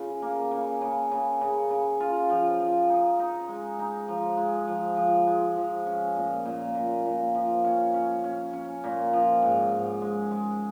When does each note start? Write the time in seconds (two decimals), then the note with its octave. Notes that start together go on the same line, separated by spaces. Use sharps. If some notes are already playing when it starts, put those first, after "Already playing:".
Already playing: C#3 F4
0.22 A#3
0.51 C#3
0.81 C#3
1.11 C#3
1.41 C#3
1.70 C#3
2.00 F4
2.30 F3
2.60 F3
2.89 D#4
3.19 D#4
3.48 G#3
3.79 D#4
4.08 F3
4.37 G#3
4.68 F3
4.97 F3
5.27 G#3
5.56 F3
5.86 C#4
6.16 A#2
6.45 A#2
6.75 A#2
7.05 A#2
7.35 F3
7.64 C#4
7.94 C#4
8.24 C#4
8.53 C#4
8.84 A#2
9.13 F3
9.42 G#2
9.72 G#2
10.02 G#3
10.31 G#3